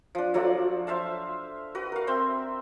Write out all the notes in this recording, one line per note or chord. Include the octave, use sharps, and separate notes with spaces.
F3 D4
F3 F#3 A3 D5
C5 E5 F5 A5
F#4 B4
A#4 F5
C4 E5 G5 C6